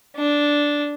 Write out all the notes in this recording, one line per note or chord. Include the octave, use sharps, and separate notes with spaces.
D4